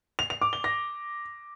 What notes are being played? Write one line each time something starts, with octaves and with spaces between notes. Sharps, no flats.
F7
F7
D6
G7
A#6